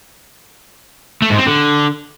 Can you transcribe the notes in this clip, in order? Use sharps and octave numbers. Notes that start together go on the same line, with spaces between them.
A3
G#2
C4
D3